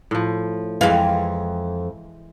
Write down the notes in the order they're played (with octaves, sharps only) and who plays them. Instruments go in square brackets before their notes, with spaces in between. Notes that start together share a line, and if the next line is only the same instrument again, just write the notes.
[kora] A2 F3
[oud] F2 F5 [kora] E3 G#3